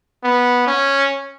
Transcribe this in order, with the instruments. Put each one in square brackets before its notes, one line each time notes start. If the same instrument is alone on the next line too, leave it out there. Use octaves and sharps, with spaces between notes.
[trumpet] B3
C#4